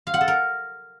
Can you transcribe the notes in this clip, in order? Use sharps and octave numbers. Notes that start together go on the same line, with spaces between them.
F5
F#5
A4
A#4